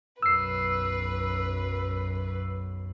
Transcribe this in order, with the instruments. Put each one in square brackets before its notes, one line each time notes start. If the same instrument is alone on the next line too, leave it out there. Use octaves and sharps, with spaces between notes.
[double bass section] B1 F#2 [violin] B4 [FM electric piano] E6 C7